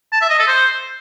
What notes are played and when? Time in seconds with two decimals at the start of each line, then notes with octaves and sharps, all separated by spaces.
0.13 A5
0.21 E5
0.30 D#5
0.39 A4
0.48 C5